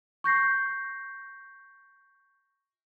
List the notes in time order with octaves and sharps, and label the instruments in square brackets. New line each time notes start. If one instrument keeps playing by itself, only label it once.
[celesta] C#6 G6 A#6 C7